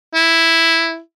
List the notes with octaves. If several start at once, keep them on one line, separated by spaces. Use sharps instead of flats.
E4